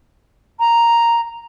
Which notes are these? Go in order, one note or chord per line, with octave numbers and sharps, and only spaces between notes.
A#5